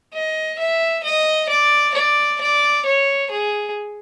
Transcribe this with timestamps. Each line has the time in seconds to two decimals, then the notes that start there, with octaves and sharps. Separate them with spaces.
0.14 D#5
0.59 E5
1.04 D#5
1.49 D5
1.94 D5
2.41 D5
2.85 C#5
3.31 G#4